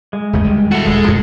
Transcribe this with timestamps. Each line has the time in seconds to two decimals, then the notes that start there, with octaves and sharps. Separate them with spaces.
0.13 G#3
0.33 F#1 D#2 A3
0.44 D#3 G3
0.72 E4 F#4 A4
0.86 D#1 G#3
1.08 F2 A2